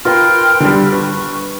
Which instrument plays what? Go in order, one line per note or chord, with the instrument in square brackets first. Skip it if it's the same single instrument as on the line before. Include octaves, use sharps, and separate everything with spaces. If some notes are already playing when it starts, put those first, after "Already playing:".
[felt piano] F4 A#4 B4 [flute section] G5 C6 F6
[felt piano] D3 G3
[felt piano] B4 [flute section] C#6